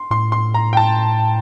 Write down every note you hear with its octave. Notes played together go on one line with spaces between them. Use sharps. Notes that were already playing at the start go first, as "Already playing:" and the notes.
Already playing: C6
A2 C6
C6
A#5
G5
A5